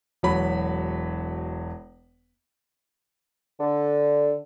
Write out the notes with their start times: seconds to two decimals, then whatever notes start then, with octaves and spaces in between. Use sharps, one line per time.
0.23 E1 F#3 B5
3.60 D3